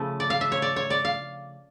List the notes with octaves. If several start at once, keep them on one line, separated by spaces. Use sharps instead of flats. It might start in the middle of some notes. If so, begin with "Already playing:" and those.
Already playing: C#3 F3 A3
D5
F5
E5
C#5
D5
C#5
D5
F5